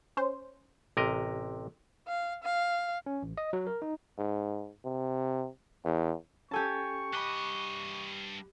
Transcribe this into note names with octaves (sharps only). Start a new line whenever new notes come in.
C#4 C5
A1 C3 A#4 D#5
F5
F5
C#4
A1
D#5
F#3
A#4
D#4
G#2
C3
E2
C#4 G4 A4 G#5 A5 C#6
G2 D#5 B5 D6 F#6